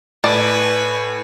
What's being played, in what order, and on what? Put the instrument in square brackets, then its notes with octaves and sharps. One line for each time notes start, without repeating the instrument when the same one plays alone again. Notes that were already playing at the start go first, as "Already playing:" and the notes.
[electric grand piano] A2 [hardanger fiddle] B4 G#5 [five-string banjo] D5 A5